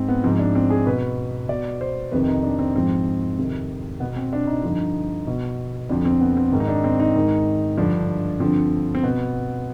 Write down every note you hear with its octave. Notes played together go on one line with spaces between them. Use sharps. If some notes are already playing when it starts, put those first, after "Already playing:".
Already playing: G#2 C4
B3
G#2 F3 C4
D4
C4
G#4
B2 B4
B2 D5
C5
F2 C3 D#3 B4
D#4
D4
C4
G#2 F3 C4
F2 C3 D#3
B2 B3
C4
D4
D#4
G2 D3 F3
B2
F2 D3 F3 D4
C4
B3
C4
G#2 D#3
D#4
D4
C4
D#4
G#2 D#3
G2 D3 F3 D4
G2 D3 F3 C4
C4
B2 B3